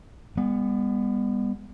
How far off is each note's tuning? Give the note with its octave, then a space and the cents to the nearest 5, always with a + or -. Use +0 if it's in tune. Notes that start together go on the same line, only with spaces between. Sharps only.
G3 +45 B3 +0